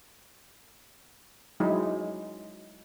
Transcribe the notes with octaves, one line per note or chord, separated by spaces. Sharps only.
F#3 G#3 D#4 E4